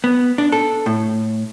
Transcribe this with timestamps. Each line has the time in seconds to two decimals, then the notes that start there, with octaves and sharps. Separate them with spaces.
0.04 B3
0.38 D4
0.52 A4
0.86 A2